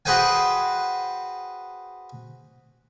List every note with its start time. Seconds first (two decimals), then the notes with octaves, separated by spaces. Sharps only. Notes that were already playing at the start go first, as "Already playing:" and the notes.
0.05 F#4 G#4 B4 C5 G5 G#5